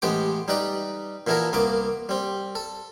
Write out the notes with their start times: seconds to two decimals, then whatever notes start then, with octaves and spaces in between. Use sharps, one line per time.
0.02 A1 G#3 B3 G4 D6
0.48 G3 D#4 B4 D5
1.27 A#2 E3 B3 E4 A4 A#4
1.53 C2 A#3 B3 D6
2.09 G3 C4
2.55 A4